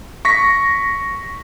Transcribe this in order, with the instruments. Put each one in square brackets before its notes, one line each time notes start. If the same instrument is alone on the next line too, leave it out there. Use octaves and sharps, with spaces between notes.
[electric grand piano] C#6 A#6 B6